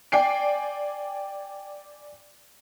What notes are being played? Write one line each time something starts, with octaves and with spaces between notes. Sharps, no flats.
D5 G5 G#5 C7 D7